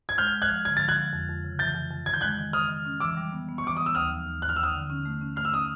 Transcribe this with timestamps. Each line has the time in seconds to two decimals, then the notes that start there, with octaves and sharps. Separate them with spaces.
0.09 G#6
0.18 G#3 F6 G6
0.34 G#3
0.42 F#6 G#6
0.49 F3
0.65 D3 G#6
0.77 F3 A6
0.88 F#6 G#6
0.97 F3
1.13 F2
1.29 F2
1.44 C#3
1.59 E3 G6 A6
1.75 F2
1.91 F2
2.06 D#3 G#6
2.14 G6
2.21 G#3 F#6 G#6
2.39 D#3
2.53 D#3 D#6 F6
2.69 D#3
2.85 C#4
3.00 E3 D6 E6
3.17 G3
3.32 B3
3.49 B3
3.58 C#6
3.64 E3 D6
3.77 B3 D#6
3.86 E6
3.95 D#2 D#6 F6
4.10 F3
4.27 D#2
4.42 D#2 F#6
4.49 F6
4.56 D#2 E6
4.63 D#6 F6
4.74 D3
4.90 C#4
5.05 A3
5.21 C#4
5.36 A3 F6
5.45 E6
5.52 C#4 D#6